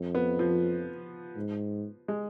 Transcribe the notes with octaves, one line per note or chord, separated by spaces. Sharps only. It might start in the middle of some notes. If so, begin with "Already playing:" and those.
Already playing: F2
B3
F3
G#2
G#3